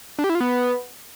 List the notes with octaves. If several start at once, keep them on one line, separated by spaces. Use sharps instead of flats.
D4
G4
E4
F4
B3